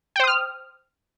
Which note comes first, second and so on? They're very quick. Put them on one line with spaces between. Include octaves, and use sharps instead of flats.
G5 C5 D#6 F6